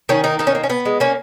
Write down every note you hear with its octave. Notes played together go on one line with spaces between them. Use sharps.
D#3 C#4
A#3 D#4
D#3 D#4
C#4
A#3
C#4
B3
G#3
A#3 C#4